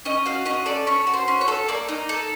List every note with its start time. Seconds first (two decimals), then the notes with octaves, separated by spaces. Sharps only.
0.05 C#4 D#5
0.26 F#4 F5
0.45 C#4 D#5
0.66 A4 D5
0.87 C#4 C#5
1.07 F#4
1.14 C5
1.28 C#4
1.41 C#5
1.48 A4
1.68 A#3 D5
1.89 D#4
2.09 A4